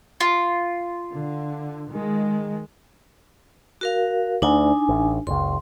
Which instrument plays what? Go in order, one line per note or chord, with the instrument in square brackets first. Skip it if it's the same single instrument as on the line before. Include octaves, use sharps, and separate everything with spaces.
[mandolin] F4
[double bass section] D3
D#3 G#3
[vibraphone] F#4 A#4 F5
[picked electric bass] D2 [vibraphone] D4 D#4 G#5
[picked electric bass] A1
[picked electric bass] F#1 C#2 [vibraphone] C6